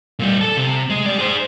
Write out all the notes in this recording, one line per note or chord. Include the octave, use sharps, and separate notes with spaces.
A#2 G3
A4 A5
C3
G#3
G4 D5
G#4 C5